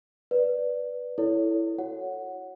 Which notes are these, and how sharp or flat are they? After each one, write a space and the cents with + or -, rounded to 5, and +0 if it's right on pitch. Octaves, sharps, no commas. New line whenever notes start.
B4 +0 D5 +0
E4 +0 A4 +10 C#5 +25
F#4 +0 C#5 +0 F#5 +0